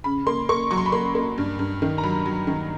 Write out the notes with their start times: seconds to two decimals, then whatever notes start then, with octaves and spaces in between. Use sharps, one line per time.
0.04 C#3 B5
0.27 A#3 C6
0.49 A#3 C#6
0.71 F#3 C#6
0.78 C6
0.86 B5
0.92 A#3 C6
1.15 A#3
1.38 G2
1.59 G2
1.82 D#3
1.98 A#5
2.03 F#3 B5
2.26 F#3
2.47 D#3